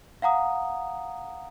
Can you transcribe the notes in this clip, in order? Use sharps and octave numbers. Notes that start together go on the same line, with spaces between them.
F5 F#5 A#5 D#6